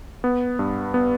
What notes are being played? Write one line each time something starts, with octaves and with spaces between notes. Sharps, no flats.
B3
G2
B3